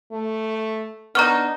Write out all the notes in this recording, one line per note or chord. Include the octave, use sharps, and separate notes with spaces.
A3
B3 D4 D#4 A#5 C#6 F6